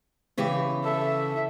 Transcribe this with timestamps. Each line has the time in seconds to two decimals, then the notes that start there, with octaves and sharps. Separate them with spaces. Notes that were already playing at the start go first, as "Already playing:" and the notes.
0.38 C#3 E3 G4
0.85 A4 E5